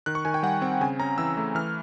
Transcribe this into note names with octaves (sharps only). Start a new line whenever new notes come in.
D#3 F#6
C#6
D#3 G#5
G5
G3 F#5
C4 G5
C#3 G#5
C#4 A#5
E3 E6
A3
E3 F6